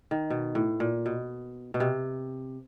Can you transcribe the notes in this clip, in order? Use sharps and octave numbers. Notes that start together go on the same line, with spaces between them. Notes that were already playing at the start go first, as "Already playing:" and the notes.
D#3
B2
A2
A#2
B2
B2
C3